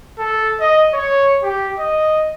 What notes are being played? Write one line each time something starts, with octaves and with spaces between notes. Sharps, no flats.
A4
D#5
C#5
G4
D#5